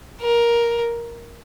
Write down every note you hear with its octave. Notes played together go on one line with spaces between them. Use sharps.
A#4